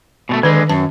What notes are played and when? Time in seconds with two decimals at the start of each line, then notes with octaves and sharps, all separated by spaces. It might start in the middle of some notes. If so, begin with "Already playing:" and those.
0.29 B2 G3 A3
0.43 D3 D#3 G#3 B4
0.70 F#2 A5